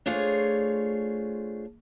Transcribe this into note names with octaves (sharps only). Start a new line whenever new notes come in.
A3 D4 F4 G#4 C5 C#5